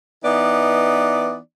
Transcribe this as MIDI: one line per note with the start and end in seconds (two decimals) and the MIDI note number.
0.24 1.38 52
0.24 1.38 59
0.24 1.38 63
0.24 1.38 74